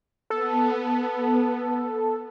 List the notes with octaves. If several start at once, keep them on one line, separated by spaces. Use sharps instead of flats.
B3 A4